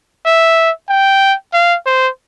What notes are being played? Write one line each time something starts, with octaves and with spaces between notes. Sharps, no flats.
E5
G5
F5
C5